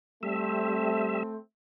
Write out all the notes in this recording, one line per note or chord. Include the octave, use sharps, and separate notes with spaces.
G3 A3 C4 E5